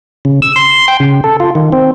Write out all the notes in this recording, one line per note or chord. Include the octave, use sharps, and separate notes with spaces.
C#3
E6
C6
G5
C#3
A4
F4
D#3
C4